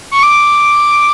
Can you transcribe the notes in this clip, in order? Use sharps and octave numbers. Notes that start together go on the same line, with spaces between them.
C#6
D6